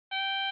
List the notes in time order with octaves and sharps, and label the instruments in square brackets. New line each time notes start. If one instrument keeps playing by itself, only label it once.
[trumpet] G5